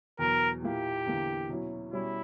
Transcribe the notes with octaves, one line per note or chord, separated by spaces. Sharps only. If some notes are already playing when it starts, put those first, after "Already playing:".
E2 B2 F#3 A#4
A#2 A#3 E4 G4
E2 D3 A#3 E4
B2 F#3 C#4 E4
B2 G3 C#4 E4